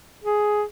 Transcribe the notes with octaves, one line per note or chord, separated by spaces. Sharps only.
G#4